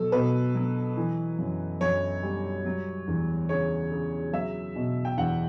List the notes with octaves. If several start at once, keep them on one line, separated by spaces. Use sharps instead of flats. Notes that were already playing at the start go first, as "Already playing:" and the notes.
Already playing: B2 F#3 A4
B2 B4
F#3
E3
F#2
F#2 C#5
G3
F#3
E2
C#3 C#5
C#3
F#3 E5
B2
G5
E2 F#5